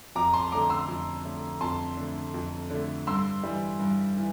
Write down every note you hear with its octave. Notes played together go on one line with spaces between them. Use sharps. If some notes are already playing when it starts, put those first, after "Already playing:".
F2 A#5 D6
A5 C6
D3 A3 A#5 D6
C6 E6
F2
D3 A3
F2 A5 C6
D3 A3
F2
D3 A3
G2 C6 E6
E3 G3
G2
E3